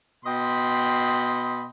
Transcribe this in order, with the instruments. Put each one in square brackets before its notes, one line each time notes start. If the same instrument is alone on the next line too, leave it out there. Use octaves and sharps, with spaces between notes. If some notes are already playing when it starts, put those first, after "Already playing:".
[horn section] B2 D#5 G5 B5 C6